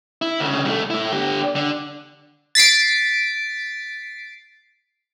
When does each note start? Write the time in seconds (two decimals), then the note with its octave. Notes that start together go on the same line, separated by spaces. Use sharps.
0.22 E4
0.40 D2 C#3
0.65 C2 A3
0.90 A2 E4
1.13 D3 G4
1.56 D3
2.55 A6 B6 C7 D7